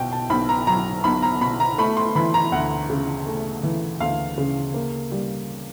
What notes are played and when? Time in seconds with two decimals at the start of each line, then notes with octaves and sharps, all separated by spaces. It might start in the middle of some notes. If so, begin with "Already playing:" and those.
Already playing: B1 B2 G5
0.12 A5
0.30 B1 B5
0.49 A#5
0.67 F#3 A#5
1.04 B1 B5
1.22 A#5
1.41 B2 B5
1.60 A#5
1.78 A3 B5
1.97 C6
2.15 E3 B5
2.34 A#5
2.52 D2 F#5
2.90 C#3
3.27 A3
3.63 E3
4.00 D2 F5
4.38 C#3
4.74 A#3
5.12 G3